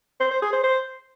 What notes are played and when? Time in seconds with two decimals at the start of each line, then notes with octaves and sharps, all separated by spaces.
0.20 C5
0.31 C5
0.42 G#4
0.53 C5
0.64 C5